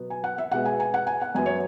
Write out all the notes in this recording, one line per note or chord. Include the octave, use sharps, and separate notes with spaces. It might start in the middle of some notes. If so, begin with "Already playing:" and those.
Already playing: B2 F#3 B3
G#5
F#5
E5
B2 G#3 B3 F#5
G#5
G#5
F#5
G#5
F#5
F#2 F#3 B3 G#5
C#5